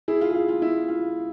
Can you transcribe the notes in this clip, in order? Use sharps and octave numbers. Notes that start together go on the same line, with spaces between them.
E4 G#4
F4
G#4
F4
F4
E4
F4